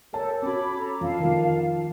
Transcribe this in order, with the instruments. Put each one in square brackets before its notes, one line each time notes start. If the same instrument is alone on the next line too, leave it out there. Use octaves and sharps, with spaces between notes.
[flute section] G4 A4 [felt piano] A#4 C#5 A5
[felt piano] C#4 F#4 [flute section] C#5 B5 D6
[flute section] A4 A#5
[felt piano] F2 [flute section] F5 A5
[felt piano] D#3 F3